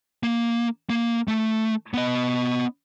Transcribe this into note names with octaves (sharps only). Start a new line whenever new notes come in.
A#3
A#3
A3
B3 D#5